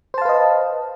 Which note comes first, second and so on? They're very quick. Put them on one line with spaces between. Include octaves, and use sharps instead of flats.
C5 A5 F5 B4 D#5